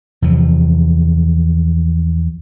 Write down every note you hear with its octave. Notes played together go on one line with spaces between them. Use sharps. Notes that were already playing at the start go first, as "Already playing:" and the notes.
E2 C3 F3